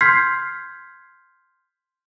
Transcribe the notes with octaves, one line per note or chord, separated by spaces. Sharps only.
C6 F6 G6 G#6 B6 C7